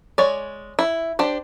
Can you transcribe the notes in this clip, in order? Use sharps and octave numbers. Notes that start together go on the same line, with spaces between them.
G#3 C#5 D5
E4
D4 G4 C5